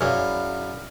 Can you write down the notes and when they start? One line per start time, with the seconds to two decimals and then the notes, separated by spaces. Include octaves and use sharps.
0.01 F#2 E3 E4 G#4 C#5 D5 F5 F6